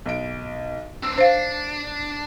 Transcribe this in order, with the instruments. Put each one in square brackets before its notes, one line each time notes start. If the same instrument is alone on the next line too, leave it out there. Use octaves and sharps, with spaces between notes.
[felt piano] B1 D7
[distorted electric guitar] C4 D4 [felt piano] E6
[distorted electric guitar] D4 [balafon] C5 F5 [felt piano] C7